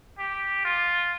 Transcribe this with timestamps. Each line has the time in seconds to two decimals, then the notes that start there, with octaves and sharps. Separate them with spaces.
0.18 G4
0.65 F4